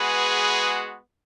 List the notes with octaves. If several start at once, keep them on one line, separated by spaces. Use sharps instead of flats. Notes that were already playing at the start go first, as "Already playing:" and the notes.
Already playing: G#3 B3 F#4 G#4 B4